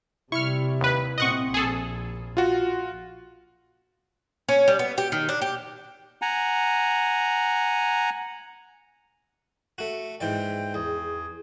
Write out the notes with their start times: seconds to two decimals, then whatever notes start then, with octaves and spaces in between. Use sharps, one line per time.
0.32 C3 G3 E4 C#6 F6
0.81 D#2 B4
1.18 A#2 C4 D#5 F#5 C#6
1.54 A#1 G#4 A4
2.37 F4 F#4
4.49 C#4
4.68 G3
4.79 B3
4.98 G4
5.12 D#3
5.29 D4
5.42 G4
6.22 F#5 G#5 A#5
9.78 A3 F#4
10.20 G#2 E3 D5 G5
10.74 E2 G#4